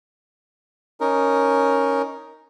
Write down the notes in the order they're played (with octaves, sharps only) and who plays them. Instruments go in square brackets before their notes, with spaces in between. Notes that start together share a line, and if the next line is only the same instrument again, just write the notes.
[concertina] C#4 D#4 A#4